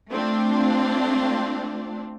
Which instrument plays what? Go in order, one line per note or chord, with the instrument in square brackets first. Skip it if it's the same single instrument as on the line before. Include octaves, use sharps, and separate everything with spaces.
[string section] A3 C4 D4 F4